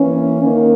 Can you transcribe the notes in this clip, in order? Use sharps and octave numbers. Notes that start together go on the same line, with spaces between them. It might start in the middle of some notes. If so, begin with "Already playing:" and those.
Already playing: E3 A#3 C#4
D#3 A#3 D#4 A#4